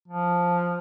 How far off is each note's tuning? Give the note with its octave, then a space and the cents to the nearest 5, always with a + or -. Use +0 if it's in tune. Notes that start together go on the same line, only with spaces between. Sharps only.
F3 +5